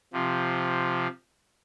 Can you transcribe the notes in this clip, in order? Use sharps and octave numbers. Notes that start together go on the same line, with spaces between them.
C3 F3